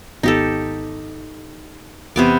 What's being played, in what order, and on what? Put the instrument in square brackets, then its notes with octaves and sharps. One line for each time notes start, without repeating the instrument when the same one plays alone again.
[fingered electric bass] G#1 B3 [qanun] D#4 G4 A4
[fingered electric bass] E2 [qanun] C3 B3 D6